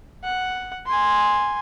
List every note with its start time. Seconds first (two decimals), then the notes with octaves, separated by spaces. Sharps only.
0.24 F#5
0.86 G#5 C6